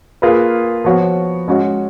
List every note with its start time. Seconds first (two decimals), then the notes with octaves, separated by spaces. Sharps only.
0.22 A#3 F4 G#4 B4
0.84 F3 B3 F#4 C#5
1.48 G#3 C#4 F#4 C#5